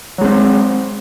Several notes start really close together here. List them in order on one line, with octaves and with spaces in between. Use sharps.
F#3 G#3 C4